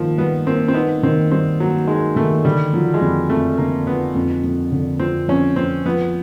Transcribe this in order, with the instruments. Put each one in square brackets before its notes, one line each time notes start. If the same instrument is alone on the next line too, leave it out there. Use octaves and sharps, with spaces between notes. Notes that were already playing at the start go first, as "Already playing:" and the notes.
Already playing: [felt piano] D#3 A#3 D#4 [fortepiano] F3
[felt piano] G3 [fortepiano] B3
[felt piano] A#3 [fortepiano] C4
[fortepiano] C4
[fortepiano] B3 [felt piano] D#4
[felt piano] D#3 [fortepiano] C4
[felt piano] G3 [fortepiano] C4
[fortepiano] F#3 [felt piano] A#3
[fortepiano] G#3 [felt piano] D#4
[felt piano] D#3 [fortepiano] A3
[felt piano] D3 [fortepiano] G3
[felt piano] F3 [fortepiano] F#3
[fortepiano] G#3
[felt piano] F2 [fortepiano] G3
[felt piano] F2 [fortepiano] A3
[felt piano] D3 [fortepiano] A#3
[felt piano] F3 [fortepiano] B3
[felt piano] F2
F2
D3
[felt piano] F3 [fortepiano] C4
[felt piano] F2 [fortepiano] C#4
[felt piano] F2 [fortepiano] C4
[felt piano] F3 [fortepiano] B3